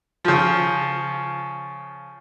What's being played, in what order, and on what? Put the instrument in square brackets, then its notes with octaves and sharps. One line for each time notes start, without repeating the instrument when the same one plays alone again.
[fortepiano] C#3 F3